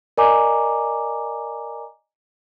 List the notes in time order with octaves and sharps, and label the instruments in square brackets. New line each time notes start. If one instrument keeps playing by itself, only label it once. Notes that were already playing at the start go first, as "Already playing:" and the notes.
[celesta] A#4 D5 D#5 G#5 A#5 D6